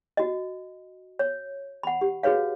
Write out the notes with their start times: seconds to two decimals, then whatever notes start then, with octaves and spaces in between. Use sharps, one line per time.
0.17 F#4 D#5
1.19 C#5
1.83 F#5 B5
2.01 G4
2.23 F#4 G#4 B4 C#5 F5